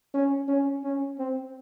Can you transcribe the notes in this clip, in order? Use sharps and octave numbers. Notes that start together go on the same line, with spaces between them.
C#4
C#4
C#4
C4